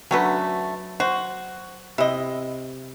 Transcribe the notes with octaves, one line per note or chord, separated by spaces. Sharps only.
D3 F#3 A3 C#4 B4
F#4 C5
C3 E4 D#5